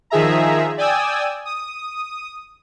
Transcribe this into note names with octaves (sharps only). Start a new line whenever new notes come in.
D#3 F3 G#4 E5 A#5
D5 G5 G#5 D#6 E6
D#6